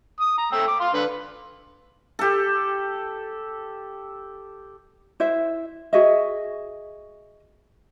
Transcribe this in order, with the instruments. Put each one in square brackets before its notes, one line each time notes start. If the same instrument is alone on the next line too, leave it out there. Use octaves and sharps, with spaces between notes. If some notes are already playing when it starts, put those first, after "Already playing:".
[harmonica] D#6
A#5
A3 G5 E6
D6
F5 C6
D3 B4
[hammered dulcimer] G4 A4
[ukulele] E4 C5 E5
F#4 G#4 D#5 E5